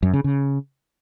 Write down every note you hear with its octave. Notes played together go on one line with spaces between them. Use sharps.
F#2
C#3
C#3